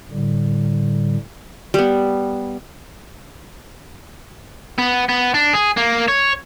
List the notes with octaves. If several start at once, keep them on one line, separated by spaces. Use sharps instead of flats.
A2 D3 G3
G3 B3
B3
B3
D4
G#4
A#3
C#5